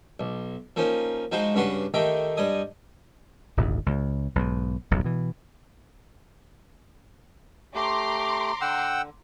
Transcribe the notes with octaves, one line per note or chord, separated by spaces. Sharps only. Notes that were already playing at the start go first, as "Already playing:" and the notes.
B1
F3 A#3 C#4 D#4
F3 G#3 D#4 F#4 C5
G2 C#3 D4 F#4 B4 C6
D#3 A3 D#4 G4 G5 D6
G2 G3 D#5 G#5 D#6
D#1 G#1 D2
C#2
B1 G#2
D1 B1 G2 B2
B2 E3
A3 G4 A#5 C6 D6
D3 F#5 G5 E6